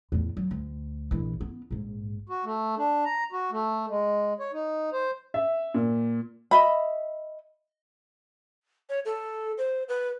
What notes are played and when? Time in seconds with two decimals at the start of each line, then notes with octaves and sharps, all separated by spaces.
0.12 E2 A2
0.37 F#3
0.51 D2
1.11 A#1 E3
1.41 B3
1.71 A#1 G#2
2.29 F#4
2.45 A3
2.78 D4
3.05 A#5
3.32 F#4
3.52 A3
3.89 G#3
4.40 C#5
4.53 D#4
4.93 C5
5.34 E5
5.74 A#2
6.51 D#5 E5 B5
8.90 C#5
9.05 A4
9.58 C5
9.89 B4